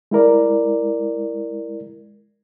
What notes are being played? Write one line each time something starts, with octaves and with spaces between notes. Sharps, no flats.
G#3 E4 A#4 D5